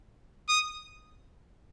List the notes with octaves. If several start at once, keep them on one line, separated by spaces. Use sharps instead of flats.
D#6